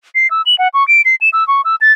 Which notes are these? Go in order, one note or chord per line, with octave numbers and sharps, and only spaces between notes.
C7
E6
F#7
F#5
C#6
D7
C7
E7
E6
C#6
E6
A6